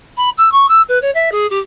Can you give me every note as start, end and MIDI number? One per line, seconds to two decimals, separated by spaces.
0.17 0.30 83
0.38 0.49 88
0.52 0.69 85
0.69 0.82 88
0.89 0.99 71
1.02 1.11 73
1.15 1.30 76
1.32 1.49 68
1.50 1.59 67